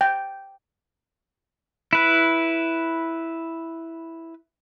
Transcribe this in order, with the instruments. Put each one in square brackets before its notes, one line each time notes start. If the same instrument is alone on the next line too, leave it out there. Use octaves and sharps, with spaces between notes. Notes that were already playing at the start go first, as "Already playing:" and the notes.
[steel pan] G5
[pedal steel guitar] E4 B4